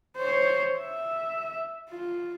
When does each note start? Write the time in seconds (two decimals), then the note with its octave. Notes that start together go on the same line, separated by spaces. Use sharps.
0.17 C5 C#5
0.79 E5
1.90 F4